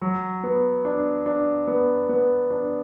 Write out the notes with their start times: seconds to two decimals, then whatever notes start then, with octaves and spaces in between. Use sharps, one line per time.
0.01 F#3
0.44 B3
0.85 D4
1.26 D4
1.67 B3
2.09 B3
2.50 D4